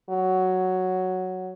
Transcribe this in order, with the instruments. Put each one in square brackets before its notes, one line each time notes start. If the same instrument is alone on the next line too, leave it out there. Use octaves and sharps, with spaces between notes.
[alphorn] F#3